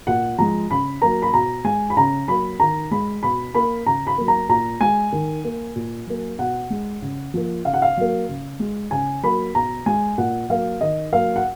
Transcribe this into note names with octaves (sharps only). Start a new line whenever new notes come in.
A#2 F#5
F3 G#3 A#5
C#3 B5
F#3 A#3 A#5
B5
B2 A#5
G#3 G#5
B5
C#3 A#5
F#3 A#3 B5
D#3 A#5
G#3 B5
B2 B5
A#3 B5
C#3 A#5
B5
F#3 A#3
A#5
A#2 A#5
G#3 G#5
D#3
A#3
A#2
F#3 A#3
B2 F#5
G#3
C#3
F3 A#3
C#3 F5
F#5
F5
F#3 A#3
C#3
G#3
C#3 G#5
F#3 A#3 B5
B2 A#5
G#3 G#5
A#2 F#5
F#3 A#3 F5
D#3 D#5
F#3 A#3 F5
F#5